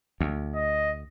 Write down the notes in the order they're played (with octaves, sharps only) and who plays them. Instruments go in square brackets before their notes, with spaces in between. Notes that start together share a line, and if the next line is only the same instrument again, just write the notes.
[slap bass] D2
[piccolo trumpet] D#5